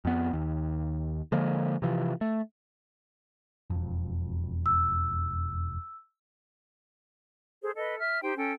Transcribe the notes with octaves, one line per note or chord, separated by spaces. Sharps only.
F2 B3
D#2
D3 F3 G#3 A#3
C3 E3 F3
A3
E1 F2
E6
G#4 A4 C5
A4 B4 D#5
E5 F6
D#4 G4 C5 G5
C#4 A4 G5